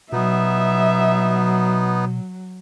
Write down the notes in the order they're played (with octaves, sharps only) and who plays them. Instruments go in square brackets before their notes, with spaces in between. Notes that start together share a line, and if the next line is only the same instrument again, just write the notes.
[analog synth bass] B2 [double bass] F#3 [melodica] B3 D#4 [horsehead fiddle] E5